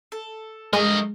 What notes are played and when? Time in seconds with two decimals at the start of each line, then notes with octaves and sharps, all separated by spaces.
0.12 A4
0.73 G2 G#3 A3 A#4 D#5